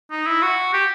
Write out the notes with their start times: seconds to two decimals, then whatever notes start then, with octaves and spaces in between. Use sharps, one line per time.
0.11 D#4
0.26 E4
0.42 F#4
0.74 G4